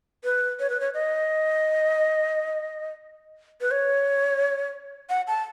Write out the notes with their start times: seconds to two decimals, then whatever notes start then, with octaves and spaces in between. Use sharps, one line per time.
0.24 B4
0.60 C#5
0.70 B4
0.80 C#5
0.94 D#5
3.61 B4
3.71 C#5
5.10 F#5
5.27 A5